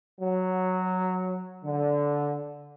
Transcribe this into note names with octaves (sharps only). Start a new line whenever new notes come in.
F#3
D3